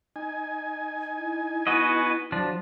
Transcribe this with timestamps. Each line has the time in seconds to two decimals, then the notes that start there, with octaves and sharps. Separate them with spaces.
0.16 D#4 G#5
1.17 E4
1.67 B3 F#4 D#5
2.32 F3 F#3 D4